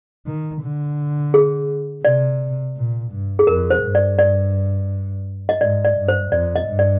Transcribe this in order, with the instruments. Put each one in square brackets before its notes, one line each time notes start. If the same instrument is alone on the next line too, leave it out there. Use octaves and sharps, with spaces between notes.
[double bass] D#3
D3
[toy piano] G#4
[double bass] C3 [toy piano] D5
[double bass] A#2
G2
[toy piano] G#4
[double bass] F2 [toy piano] A#4
[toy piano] C5
[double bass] G2
[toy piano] D5
D5
D#5
[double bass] G#2 [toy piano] D5
[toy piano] D5
[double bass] G2
[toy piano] C5
[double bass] F2 [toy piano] D5
[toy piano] D#5
[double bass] G2
[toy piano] D5